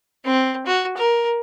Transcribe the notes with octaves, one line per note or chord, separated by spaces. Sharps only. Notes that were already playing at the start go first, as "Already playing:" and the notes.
C4
F#4
A#4